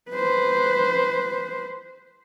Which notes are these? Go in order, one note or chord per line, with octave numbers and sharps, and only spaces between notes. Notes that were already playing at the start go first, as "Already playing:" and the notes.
B4 C5